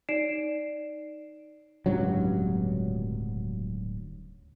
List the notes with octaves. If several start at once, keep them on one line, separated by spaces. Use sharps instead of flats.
D#4 C#5 D5 C7 D7 E7
D1 C#2 G2 F#3